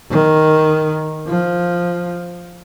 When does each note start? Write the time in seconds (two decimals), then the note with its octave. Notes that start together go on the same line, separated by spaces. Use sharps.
0.11 D#3
1.27 F3